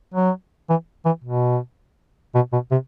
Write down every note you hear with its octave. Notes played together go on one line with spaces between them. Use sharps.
F#3
E3
E3
B2
B2
B2
C3